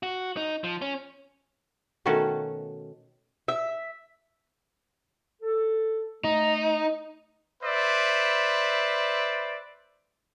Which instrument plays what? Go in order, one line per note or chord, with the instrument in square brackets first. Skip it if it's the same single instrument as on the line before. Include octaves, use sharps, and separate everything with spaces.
[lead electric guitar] F#4
D#4
F3
C#4
[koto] B2 D#3 A3 C#4 F#4 A4
[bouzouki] E5
[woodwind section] A4
[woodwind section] A3 [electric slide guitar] D#4
[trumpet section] B4 C5 D5 E5